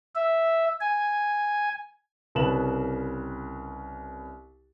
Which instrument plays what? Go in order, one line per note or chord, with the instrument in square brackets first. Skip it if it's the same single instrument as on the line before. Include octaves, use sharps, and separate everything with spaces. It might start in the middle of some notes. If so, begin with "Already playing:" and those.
[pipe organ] E5
G#5
[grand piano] C2 C#3 B4 A5 E7 F#7